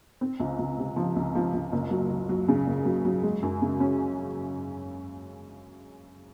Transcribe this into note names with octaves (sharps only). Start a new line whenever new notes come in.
C4
C#2
C#2
C3
F3
C#2
F3
C#2
F#1
F#3
F#3
F#3
C#3
F#1
F#3
F#3
G#3
F#2
C#3
C#4